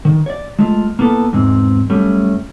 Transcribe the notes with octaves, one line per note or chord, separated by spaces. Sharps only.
D#3
C#5 D5
G#3 A3 F4
A#3 B3 E4 A4
E2 G#2 G#3 C4
F#2 G3 A3 C#4